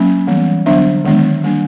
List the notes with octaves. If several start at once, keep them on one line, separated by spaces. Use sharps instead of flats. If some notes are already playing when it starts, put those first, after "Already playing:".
Already playing: F#3 A#3 C#4
E3 G3 B3
D3 F#3 B3 D4 E5
D#3 G#3 B3 D4
G3 A#3 D4